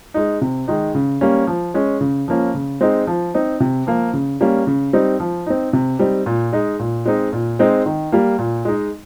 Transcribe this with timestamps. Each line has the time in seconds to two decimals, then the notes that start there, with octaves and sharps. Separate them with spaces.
0.14 G#3 D#4
0.42 C3
0.68 D#3 G#3 D#4
0.95 C#3
1.21 G3 A#3 C#4
1.47 F3
1.74 G#3 C#4
2.01 C#3
2.28 F3 A#3 C#4
2.54 C#3
2.81 G#3 C4 D#4
3.07 F3
3.34 C4 D#4
3.60 C3
3.87 F3 A#3
4.13 C#3
4.41 G3 A#3 C#4
4.67 C#3
4.93 G3 C4 D#4
5.20 F3
5.46 C4 D#4
5.73 C3
5.99 G3 C4 D#4
6.26 A#2
6.53 G#3 D#4
6.80 A#2
7.06 G#3 C4 D#4
7.33 A#2
7.59 G#3 C4 D#4
7.86 D#3
8.12 G3 A#3
8.39 A#2
8.65 G#3 D#4